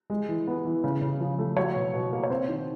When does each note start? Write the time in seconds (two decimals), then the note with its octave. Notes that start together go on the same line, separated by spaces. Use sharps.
0.10 G#3
0.29 E3
0.47 B3
0.65 E3
0.84 C#3
1.02 C#3
1.20 F3
1.39 A3
1.56 F#3 C#5
1.76 B2
1.94 B2
2.13 A#3
2.23 C#5
2.30 C4 C5
2.49 D#3